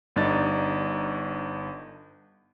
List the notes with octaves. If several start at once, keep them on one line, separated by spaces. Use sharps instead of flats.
G1 G2 D4 D#4 A6